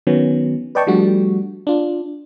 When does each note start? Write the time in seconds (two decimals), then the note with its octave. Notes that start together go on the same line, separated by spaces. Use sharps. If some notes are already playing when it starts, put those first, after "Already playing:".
0.07 D#3 F#3 B3 C#4
0.75 B4 D5 D#5 G5 A5 C#6
0.87 F3 G3 A3 D4 F#4
1.67 D4 F4